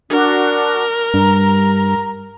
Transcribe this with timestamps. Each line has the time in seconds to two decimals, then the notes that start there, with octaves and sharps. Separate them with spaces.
0.10 D4 F#4 A#4
1.14 G2 A#5